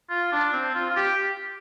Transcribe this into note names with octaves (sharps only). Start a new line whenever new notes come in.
F4
D4
C4
F4
F4
G4